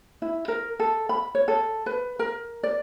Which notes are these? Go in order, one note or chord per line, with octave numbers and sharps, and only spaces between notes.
E4
A#4
A4
B5
C#5
A4
B4
A#4
D5